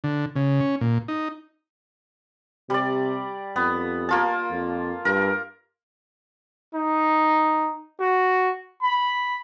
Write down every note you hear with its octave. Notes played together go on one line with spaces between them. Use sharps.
D3
C#3
C#4
A#2
D#4
C3 G3 D5
F2 B3
A#3 F4 A5
F2
G2 A#4
D#4
F#4
B5